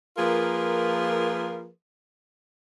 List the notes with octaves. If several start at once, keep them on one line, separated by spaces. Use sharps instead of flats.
F3 A#3 F4 G#4 A#4 B4